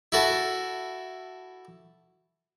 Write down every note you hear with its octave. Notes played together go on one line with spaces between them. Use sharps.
E4 F#4 A4